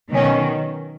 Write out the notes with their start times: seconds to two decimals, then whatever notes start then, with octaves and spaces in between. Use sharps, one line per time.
0.12 B2 D#3 F#3 C#4